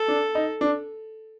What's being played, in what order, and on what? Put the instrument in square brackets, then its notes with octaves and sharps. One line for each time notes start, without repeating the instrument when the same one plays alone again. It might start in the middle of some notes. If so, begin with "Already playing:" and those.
Already playing: [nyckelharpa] A4
[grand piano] D4
D#4
D4